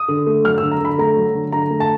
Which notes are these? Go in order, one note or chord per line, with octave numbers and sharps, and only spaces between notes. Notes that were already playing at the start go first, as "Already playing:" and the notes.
Already playing: D#6
D3
A3
F#3 F6
D3 E6
A#5
D3 B5
A3 A#5
F#3
D3
D3 A#5
A3
A5